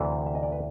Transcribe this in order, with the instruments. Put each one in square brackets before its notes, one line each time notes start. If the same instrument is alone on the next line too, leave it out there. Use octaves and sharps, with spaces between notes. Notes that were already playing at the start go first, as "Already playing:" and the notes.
Already playing: [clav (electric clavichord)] D2 C3 E3
E5
D#5
D5
B4